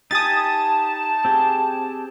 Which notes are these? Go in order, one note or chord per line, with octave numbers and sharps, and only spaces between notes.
D#4 G4 G#5 A5 D#6 A6
C4 G4 G#4